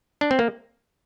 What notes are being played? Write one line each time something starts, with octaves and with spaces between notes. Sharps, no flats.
D4
C4
A#3